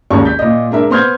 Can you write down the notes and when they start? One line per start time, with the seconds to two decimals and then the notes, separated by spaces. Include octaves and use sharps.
0.10 G#1 D#2 G#3 C#4 C#6
0.25 G6 B6
0.39 A#2 D#5
0.71 G#3 D4 A#4 E5
0.90 B3 C5 C6 F6 G6 G#6